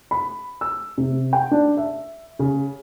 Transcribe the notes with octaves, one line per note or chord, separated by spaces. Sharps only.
B5
E6
C3
G5
D4
E5
C#3